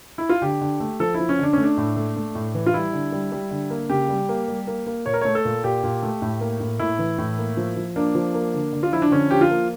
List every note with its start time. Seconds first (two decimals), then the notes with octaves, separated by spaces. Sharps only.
0.18 E4
0.29 F4
0.42 D3 G4
0.61 D3
0.80 A3
1.00 F3 A4
1.15 F3 E4
1.29 C#4
1.39 D3 D4
1.53 A3 C#4
1.64 D4
1.78 A2
1.96 A3
2.16 A3
2.35 A2
2.54 E3
2.66 F4
2.74 G3 E4
2.93 D3
3.12 G3
3.32 G3
3.51 D3
3.70 A#3
3.89 C#3 G4
4.09 G3
4.29 A#3
4.48 G3
4.67 A#3
4.87 A#3
5.06 A#2 C#5
5.13 A#4
5.21 A3 C#5
5.35 A4
5.45 A#2
5.64 A#2 G4
5.83 A#2
6.03 A3
6.22 A2
6.41 A#3
6.60 A2
6.79 A2 E4
6.99 E3
7.18 A2
7.38 A#3
7.57 F3
7.77 F3
7.96 A#3 D4
8.15 F3
8.34 A#3
8.54 D3
8.73 D3
8.83 F4
8.92 F3 E4
9.02 D4
9.11 D3 C#4
9.31 F3 G4
9.41 F4
9.51 A#3